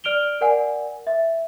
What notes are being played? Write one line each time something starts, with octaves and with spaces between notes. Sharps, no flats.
D5 F6 D7 F7 G7
A#4 D5 F#5 G#5
E5